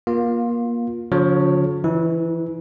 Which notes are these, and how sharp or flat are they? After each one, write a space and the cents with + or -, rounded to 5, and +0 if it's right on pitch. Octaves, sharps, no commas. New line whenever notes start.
A#3 +25 F4 +15
D3 -45 F3 +40 C#5 +0
E3 +15 E4 -40